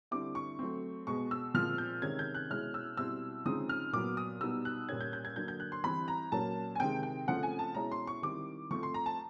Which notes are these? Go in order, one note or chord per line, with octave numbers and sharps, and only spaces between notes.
D3 G3 C4 E4 D6
C#6
F#3 A3 C4
B2 G#3 B3 C#6
E6
A#2 F3 G#3 C4 F6
G6
C3 D#3 G#3 C#4 G#6
G6
F#6
B2 G#3 C#4 E4 F6
E6
B2 G3 C4 E4 E6
C#3 F3 G#3 C4 D#4 D#6
F6
A#2 F#3 B3 D6
D#6
B2 G3 B3 D#4 E6
F#6
A#2 G3 A#3 C#4 G#6
G6
G6
G#6
D3 F#3 A#3 G6
G6
F#6
C6
E3 G3 C4 E4 B5
A#5
A#2 F#3 A#3 C#4 A5
G#5
C3 D#3 G#3 C4 G5
G5
C#3 F3 A3 C4 F#5
G#5
A5
B2 G#3 C#4 E4 A#5
C6
C#6
D#3 G3 C4 E4 D6
F3 A3 C4 C#6
C6
A#5
A5